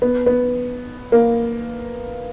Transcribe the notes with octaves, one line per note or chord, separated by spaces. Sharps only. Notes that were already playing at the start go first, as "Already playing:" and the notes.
B3
B3
A#3